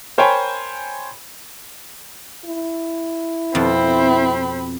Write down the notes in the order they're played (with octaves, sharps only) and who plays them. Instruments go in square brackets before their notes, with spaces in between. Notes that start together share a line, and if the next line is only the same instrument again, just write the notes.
[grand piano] A#4 C5 C#5 G5 G#5 B5
[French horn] E4
[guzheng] F2 B2 [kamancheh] C4 B5